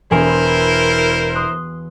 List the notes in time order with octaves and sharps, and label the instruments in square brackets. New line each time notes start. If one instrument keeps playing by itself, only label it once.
[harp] E1 G#5 C6 [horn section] E4 A#4 C5
[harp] C6 D#6 F#6